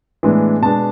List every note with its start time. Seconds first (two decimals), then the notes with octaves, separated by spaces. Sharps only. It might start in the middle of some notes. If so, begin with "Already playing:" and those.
0.23 A2 E3 G#3 B3 D4
0.62 B2 G#3 B3 D4 A5